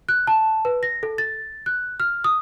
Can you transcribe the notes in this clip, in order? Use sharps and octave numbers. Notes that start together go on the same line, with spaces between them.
F#6
A5
B4
A#6
A4
A6
F#6
F6
D#6